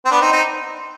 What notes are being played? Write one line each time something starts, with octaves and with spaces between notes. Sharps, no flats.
C4
B3 D4
C4 D#4
C4 D#4